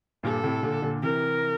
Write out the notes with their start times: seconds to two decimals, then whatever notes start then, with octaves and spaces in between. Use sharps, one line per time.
0.23 G2 A#2 A4
0.43 A2 C3
0.63 A#2 D3
0.82 A#2 D3
1.02 C3 E3 A#4